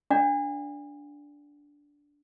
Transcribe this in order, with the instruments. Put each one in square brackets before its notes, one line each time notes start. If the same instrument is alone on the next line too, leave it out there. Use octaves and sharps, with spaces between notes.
[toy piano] D4 D5 F#5